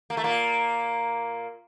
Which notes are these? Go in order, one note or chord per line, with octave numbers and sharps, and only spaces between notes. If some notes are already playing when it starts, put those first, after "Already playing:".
A#3
A3
A#2 A#3